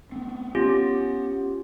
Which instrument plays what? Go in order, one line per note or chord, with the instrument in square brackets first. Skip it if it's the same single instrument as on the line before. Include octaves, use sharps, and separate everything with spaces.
[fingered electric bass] B3 C4
[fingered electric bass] B3 [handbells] C#4 F4 G4